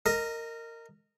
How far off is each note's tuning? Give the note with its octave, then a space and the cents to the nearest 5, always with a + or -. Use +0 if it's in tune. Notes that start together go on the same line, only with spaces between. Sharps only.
A#4 -20 D#5 +0